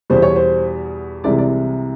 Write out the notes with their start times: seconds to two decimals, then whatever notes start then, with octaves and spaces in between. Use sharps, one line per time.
0.10 E2 B2 G3 C5
0.22 C#5
0.36 C5
1.24 C2 C3 E3 G#3 D5
1.38 D5